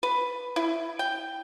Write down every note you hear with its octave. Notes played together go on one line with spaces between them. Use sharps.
B4
E4
G5